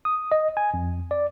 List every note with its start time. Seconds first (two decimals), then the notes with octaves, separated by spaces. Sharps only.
0.05 D#6
0.32 D#5
0.57 G#5
0.74 F2
1.11 D5